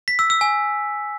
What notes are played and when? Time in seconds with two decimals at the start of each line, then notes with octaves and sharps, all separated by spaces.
0.08 B6
0.19 E6
0.30 E6
0.41 G#5